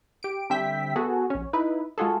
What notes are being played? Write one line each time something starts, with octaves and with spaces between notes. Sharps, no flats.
G4 D7
D3 G3 C4 E5 G5 B6
B3 F#4 G#4 A4
A#1 C#4
D#4 E4 B4
G#3 F4 F#4 G#4 A4